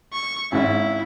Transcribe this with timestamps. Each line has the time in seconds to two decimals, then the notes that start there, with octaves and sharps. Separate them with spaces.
0.13 C#6
0.52 G#1 G#2 C#3 E4